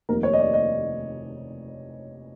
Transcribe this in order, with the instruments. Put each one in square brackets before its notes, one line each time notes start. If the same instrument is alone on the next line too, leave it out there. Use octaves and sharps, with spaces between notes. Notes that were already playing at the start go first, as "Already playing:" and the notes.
[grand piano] F1 D#2 D#3 A#4
C#5
D#5
D5
D#5